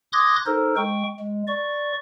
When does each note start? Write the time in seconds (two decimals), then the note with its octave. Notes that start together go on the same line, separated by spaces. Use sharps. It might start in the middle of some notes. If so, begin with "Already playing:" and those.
0.13 C6 D6 D#6 F#6 G#6 A#6
0.46 D#4 A4 A#4 C5
0.77 G#3 G5 C#6
1.20 G#3
1.48 D5 C#6